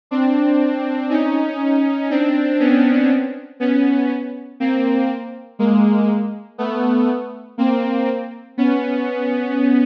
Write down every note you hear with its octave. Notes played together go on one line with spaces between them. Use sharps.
C4 D4
C#4 D#4
C4 D4
B3 C#4
B3 C#4
A#3 C4
G#3 A#3
A3 B3
A#3 C4
B3 C#4